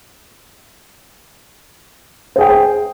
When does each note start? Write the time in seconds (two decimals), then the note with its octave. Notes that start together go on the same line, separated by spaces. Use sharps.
2.36 C5
2.38 G#4
2.41 G5